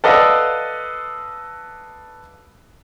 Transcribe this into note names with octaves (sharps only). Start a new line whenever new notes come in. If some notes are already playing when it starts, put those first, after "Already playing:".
A4 B4 D5 D#5 F5 F#5